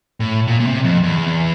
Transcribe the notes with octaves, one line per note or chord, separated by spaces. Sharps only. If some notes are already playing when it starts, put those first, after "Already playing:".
A2
A#2
A#2
C3
F2
E2